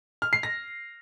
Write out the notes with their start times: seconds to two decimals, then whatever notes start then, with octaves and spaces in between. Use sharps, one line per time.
0.22 F6
0.33 C7
0.43 A#6